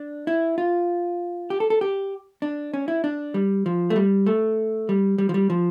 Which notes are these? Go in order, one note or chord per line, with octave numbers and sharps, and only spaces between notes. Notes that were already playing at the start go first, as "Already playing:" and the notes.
Already playing: D4
E4
F4
G4
A4
A4
G4
D4
C#4
E4
D4
G3
F3
A3
G3
A3
G3
G3
F3
G3
F3